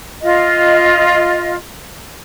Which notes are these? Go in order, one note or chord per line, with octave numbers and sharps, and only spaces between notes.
F4 D#5